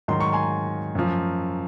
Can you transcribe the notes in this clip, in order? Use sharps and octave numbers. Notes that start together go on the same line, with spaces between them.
G#2 D#3 F#3 C6
C#6
G#5 C6
F#2 F3